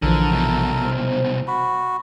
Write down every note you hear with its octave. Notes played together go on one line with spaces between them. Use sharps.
A#1 D3 E3 F3 A4 A#4
C2 B2
C5
F#4 B5